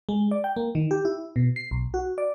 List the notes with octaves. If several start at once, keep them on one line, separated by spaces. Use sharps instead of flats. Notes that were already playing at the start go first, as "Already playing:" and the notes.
G#3
D5
G5
A#3
D#3
G4
E4
B2
C7
B1
F#4
D5